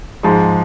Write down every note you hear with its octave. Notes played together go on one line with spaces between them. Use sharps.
G#2 F3 G#3